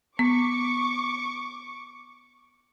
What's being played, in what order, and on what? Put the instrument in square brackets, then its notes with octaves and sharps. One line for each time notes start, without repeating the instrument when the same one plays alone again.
[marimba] B3 [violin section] C#6 D6